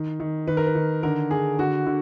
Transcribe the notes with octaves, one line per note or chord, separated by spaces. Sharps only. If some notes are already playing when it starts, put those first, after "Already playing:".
Already playing: D#3
D#3
D#3 B4
A#4
B4
D#3
D3 A#4
D3 G#4
D3 F#4
D3